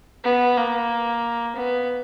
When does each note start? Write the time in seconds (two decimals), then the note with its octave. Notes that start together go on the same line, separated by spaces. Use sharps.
0.24 B3
0.57 A#3
1.56 B3